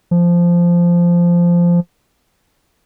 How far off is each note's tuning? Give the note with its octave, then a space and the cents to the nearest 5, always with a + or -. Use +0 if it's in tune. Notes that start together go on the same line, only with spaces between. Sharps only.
F3 -10